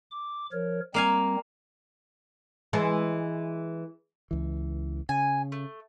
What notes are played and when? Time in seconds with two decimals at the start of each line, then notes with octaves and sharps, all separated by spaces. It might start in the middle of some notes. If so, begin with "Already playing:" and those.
0.11 D6
0.52 F3 A#4 C#5
0.94 G3 A#3 C4 F5 G#5
2.73 E3 G#3
4.31 C#2 E3
5.09 C#3 G#5
5.52 A3